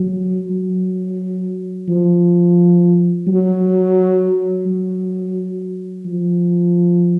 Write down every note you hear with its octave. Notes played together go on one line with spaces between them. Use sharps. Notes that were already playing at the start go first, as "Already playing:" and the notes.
Already playing: F#3
F#3
F3
F#3
F#3
F3